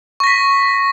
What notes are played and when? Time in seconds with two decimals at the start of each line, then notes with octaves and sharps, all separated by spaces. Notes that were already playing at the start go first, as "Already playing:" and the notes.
0.20 C#6
0.24 A#6
0.27 B6